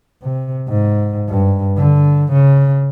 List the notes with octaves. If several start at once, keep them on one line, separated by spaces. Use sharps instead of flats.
C3
G#2
G2
D3
C#3